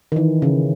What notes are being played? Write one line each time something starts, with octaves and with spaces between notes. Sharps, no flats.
D#3
E3
C#3